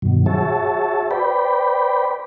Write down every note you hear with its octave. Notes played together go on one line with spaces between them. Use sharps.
G2 B2 D#3 F#3
F#4 G#4 C#5 E5 A5
B4 C5 D5 G5 B5